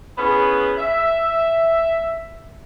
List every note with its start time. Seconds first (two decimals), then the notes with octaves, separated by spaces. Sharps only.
0.18 B3 C#4 E4 G#4 B4
0.78 E5